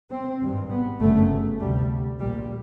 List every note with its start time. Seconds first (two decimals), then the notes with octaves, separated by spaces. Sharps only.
0.10 C4
0.41 G#1 G2
0.70 B3
1.00 G1 F#2 C#3 A3
1.60 D2 C3 G3
2.19 A#1 A#2 G3